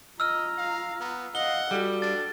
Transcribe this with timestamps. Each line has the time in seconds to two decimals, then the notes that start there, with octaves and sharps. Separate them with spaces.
0.20 F4 D#5 A#5 E6 F6
0.58 F5
1.00 B3
1.35 D#5 F5 F#5 G7
1.71 G3 F#4 A4
2.02 D4 A6